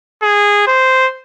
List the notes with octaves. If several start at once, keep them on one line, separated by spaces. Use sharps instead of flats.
G#4
C5